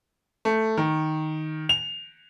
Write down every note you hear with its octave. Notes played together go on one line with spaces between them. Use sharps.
A3
D#3
F7